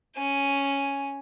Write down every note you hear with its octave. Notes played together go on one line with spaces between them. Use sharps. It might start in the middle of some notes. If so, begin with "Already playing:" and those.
C#4 G#5